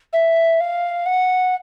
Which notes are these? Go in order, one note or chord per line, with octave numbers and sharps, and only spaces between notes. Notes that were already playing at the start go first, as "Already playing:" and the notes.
E5
F5
F#5